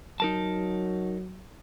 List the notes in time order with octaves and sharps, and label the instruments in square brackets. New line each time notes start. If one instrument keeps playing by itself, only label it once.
[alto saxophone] F#3 [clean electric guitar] D#4 A#4 A5